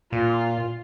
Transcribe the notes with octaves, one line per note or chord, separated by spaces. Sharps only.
A#2 F4